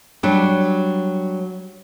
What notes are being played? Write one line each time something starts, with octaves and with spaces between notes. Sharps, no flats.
F#3 G3 D4